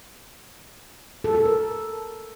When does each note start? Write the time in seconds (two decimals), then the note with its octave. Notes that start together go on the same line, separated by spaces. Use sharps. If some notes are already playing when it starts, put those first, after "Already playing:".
1.24 A4
1.35 A4
1.45 A#4